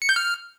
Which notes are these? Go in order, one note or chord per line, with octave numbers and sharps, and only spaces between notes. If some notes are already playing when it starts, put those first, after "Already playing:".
C#7
G6
F6